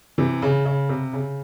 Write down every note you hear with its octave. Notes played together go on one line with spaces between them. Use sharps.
C3 E3
C#3
C#3
C3
C#3